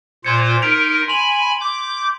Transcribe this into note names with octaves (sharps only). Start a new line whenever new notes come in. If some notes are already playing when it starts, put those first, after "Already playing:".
A#2 F4 C5 C6 G#6 C#7
D#4 A#4 B6 D7 F7
G#5 B5 C6 F7 F#7
D6 G6